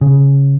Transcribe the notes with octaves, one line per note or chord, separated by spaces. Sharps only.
C#3